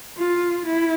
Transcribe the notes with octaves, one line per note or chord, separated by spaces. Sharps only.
F4
E4